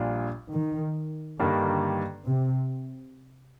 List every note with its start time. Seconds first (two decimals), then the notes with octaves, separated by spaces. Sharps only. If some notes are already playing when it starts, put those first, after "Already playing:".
Already playing: A#1 A#2 G3 D4 F4
0.52 D#3
1.39 G2 D3 D#3 G3 A#3
2.27 C3